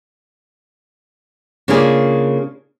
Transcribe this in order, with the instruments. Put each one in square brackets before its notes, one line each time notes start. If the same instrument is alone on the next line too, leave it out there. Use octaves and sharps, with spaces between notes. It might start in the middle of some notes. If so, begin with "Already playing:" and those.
[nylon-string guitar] C#3 A#3 D4 F4 G#4